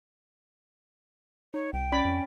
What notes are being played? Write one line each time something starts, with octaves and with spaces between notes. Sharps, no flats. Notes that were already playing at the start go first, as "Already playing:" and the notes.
D#4 C#5
C2 G5
C#4 D5 B5
F2